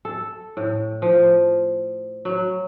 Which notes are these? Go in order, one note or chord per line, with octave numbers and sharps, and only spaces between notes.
A4
A2
F3
F#3